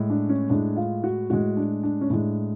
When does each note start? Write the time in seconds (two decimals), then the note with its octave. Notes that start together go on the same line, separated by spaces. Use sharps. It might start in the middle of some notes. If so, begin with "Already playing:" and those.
Already playing: A2 G#3
0.10 D4
0.29 C#4
0.50 A2 G#3 D4
0.76 F4
1.04 F#4
1.30 A2 G#3 F#4
1.57 D4
1.83 D4
2.01 C#4
2.10 A2 G#3 D4